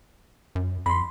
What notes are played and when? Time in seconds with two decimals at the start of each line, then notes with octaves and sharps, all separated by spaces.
0.55 F#2
0.86 F2 B5 C6